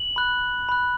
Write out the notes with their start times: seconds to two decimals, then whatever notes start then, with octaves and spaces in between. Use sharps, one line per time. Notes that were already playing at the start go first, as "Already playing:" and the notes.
Already playing: F#7
0.16 B5 F#6
0.69 B5 F#6